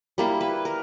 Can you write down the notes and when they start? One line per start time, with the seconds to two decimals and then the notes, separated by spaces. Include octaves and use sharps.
0.18 G3 A#3 E4
0.41 B4
0.65 A#4